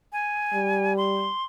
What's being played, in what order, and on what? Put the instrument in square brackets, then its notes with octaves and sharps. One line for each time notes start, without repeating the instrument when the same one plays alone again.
[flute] G#5
[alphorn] G3
[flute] C6